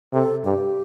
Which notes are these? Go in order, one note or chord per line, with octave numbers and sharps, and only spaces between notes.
C3 A4
G2 G4